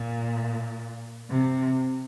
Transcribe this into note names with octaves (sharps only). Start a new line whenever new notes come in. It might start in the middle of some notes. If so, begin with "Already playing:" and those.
Already playing: A#2
C3